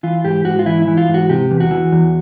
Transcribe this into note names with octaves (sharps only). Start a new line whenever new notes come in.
E3 F4
G#2 G4
G#2 F#4
F4
E3 E4
E4
E3
F4
G#2
F#4
C3 G4
E2
F#4
E3
E2